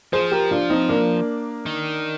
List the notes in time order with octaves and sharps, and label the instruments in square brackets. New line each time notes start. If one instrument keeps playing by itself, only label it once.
[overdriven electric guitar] F3 [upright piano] G#4 C5
[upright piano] G4 A#4
D4 F4
C4 D#4
A#3 D4
[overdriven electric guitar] D#3